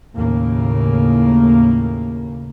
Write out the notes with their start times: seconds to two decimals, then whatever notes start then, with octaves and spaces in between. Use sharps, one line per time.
0.15 D#2 A2 C#3 A#3